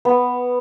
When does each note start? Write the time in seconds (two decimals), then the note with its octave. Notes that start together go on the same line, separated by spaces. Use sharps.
0.05 B3